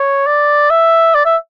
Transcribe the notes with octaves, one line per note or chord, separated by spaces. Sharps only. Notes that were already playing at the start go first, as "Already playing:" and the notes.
Already playing: C#5
D5
E5
D5
E5